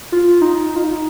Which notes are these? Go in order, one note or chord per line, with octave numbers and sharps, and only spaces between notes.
F4
D#4
F4
D#4